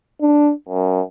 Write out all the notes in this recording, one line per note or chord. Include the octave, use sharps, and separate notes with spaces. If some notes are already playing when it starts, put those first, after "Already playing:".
D4
F#2